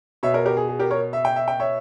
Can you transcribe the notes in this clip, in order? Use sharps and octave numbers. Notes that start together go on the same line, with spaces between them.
B2 C#5 E5
A#4 C#5
G4 A#4
G#4
G#4
G4 A#4
A#4 C#5
E5
G5
E5
G5
C#5 E5